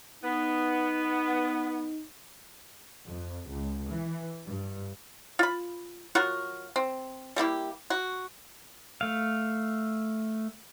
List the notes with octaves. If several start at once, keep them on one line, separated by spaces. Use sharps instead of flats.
B3 D#4
F2
C#2
E3
G2
F4 B5
F#3 F4 F#4 A#4
C4
G3 A#3 E4 G4
F#4
A3 F5